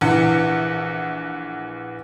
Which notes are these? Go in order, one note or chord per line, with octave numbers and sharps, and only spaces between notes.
A#1 E3 F#5